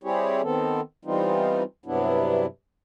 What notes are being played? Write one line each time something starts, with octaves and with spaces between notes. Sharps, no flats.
G3 C4 E4 G4 G#4 C#5
D#3 B3 C4 A4
E3 G3 B3 C4 D#4 F4
G2 C3 F#3 B3 D4 E4